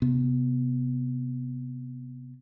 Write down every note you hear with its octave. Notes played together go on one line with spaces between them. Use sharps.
C3 B3